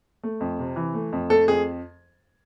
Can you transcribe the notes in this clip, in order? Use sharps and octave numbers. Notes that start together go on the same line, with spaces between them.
A3
F2
C3
E3
A3
F2
A3 A4
F2 G#4